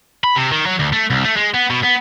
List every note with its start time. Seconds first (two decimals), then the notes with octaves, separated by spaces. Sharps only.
0.24 B5
0.36 C3
0.52 D#3
0.66 F#3
0.79 D2
0.93 A3
1.10 C2
1.24 A3
1.36 G#3
1.54 B3
1.70 B2
1.83 B3